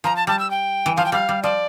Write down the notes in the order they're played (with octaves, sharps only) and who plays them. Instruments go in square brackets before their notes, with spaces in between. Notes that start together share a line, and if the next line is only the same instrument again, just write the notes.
[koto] F3 [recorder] A#5
[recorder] A5
[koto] G3 [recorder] A5
[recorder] E6
G5
[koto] E3
[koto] F3 [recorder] F5
[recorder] G5
[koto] G3 [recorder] F5
[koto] G3
[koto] F3 [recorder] D5